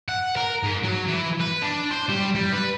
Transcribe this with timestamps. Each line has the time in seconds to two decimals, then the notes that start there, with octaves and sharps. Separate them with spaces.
0.09 F#5
0.36 A#4
0.63 G#2
0.84 F#3
1.07 E3
1.41 B4
1.63 D4
1.91 C5
2.09 G3
2.35 G3
2.52 B4